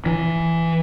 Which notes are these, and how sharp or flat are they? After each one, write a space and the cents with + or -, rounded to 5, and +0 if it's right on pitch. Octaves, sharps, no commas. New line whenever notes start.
E3 +10